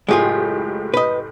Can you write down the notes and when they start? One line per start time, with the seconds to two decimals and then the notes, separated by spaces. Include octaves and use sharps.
0.08 F#1 A2 G#3 F4 G4 G#4
0.94 B4 D#5